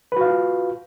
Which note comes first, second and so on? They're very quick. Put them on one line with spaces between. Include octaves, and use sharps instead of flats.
B4 F#4 F5 F4